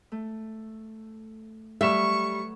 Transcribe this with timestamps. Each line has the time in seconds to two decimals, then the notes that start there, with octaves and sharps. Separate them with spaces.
0.12 A3
1.81 F#3 G3 A3 B4 E5 C#6 E7